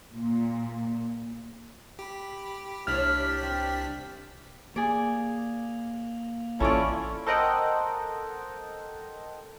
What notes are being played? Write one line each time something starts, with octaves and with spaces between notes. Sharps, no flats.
A#2
G4 B5
C2 A3 B3 D4 E4 C#5 F6 B6
G4
C4
A#3 G#4 D5
A1 C#4 E4 F4 A4 D5 C#6
A4 A#4 C5 D#5 F#5 G5